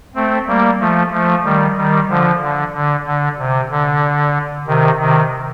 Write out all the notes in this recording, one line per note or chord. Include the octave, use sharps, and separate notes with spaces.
A3 C4
G3 A#3
F3 A3
F3 A3
D#3 G3
D#3 G3
D3 F3
D3
D3
D3
C3
D3
C3 D#3
C3 D#3